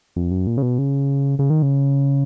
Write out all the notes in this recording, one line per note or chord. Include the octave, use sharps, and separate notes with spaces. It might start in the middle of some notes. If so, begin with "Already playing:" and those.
F2
F#2
A#2
C#3
B2
C#3
C#3
D#3
C#3